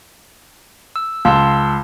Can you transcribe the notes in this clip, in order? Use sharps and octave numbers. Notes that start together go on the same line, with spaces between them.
E6
C#2 A5 C6 E6